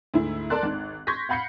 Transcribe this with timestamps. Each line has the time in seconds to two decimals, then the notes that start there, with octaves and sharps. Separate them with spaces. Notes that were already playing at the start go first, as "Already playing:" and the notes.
0.14 D2 G#2 E4
0.50 A4 A#4 D5 A5 C6 F#6
0.63 G#1 D#3
1.07 C6 C#6 G6 G#6 A#6 B6
1.29 F5 F#5 B5 G6 C7 C#7